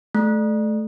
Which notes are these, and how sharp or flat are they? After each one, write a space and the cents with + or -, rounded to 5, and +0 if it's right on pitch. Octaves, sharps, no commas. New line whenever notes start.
A3 -25